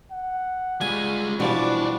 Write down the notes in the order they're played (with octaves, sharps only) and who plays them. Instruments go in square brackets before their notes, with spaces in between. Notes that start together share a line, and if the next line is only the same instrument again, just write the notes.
[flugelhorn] F#5
[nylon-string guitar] G3 [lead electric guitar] G#3 F4 [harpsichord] G#5
[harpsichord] B2 F3 G3 [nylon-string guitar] E3 [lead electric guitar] D4 [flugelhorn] D5